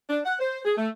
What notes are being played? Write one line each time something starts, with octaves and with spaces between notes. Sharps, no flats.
D4
F#5
C5
G#4
A3